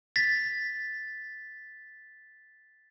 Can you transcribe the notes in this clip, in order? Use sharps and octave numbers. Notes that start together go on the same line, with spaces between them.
A6 B6